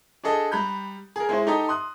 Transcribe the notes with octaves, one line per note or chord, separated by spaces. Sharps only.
D4 G#4 A4 D#5
G3 A#5 B5 F#6 G6
G#4 A#4
G#3 E4 C5
D#4 G4 A4 D#5 A#5
C6 D#6 F#6